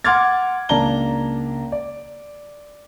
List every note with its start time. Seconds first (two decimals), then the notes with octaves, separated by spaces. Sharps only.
0.04 F#5 C6 D6 F6 G#6 A6
0.69 C#2 A#3 D4 A5 A#5 G7
1.72 D5